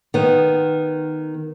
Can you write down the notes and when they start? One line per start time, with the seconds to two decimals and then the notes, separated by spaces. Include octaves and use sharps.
0.14 D#3 B3